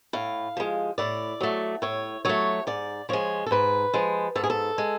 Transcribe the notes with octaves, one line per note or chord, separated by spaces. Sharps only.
A2 F5
F3 G#3
A2 D5
F#3 A3
A2 C#5
F#3 A3 C#5
G#2 D5
F3 G#3 C#5
A4
G#2 B4
F3 G#3
G#2 A4
G#4
A4
G#3